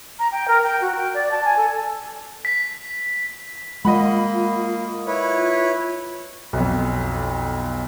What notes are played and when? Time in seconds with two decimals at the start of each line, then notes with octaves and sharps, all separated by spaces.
0.19 A#5
0.32 G5
0.48 A#4
0.63 G5
0.81 F#4
0.95 G5
1.14 D5
1.31 A5
1.45 G#5
1.57 A4
2.45 B6
3.85 G#3 A#3 F4 D#5 F#5 B5
5.07 E4 B4 C#5
6.53 B1 F2